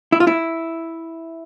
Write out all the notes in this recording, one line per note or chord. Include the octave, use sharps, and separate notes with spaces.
E4
F4
E4